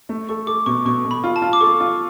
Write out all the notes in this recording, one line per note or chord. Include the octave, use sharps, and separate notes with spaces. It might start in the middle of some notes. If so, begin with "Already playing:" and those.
A3
A4 C#6
A4 D6
B2 C#6
B2 C#6
B2
B5
F4
A5
F4
D6
A4 C#6
F4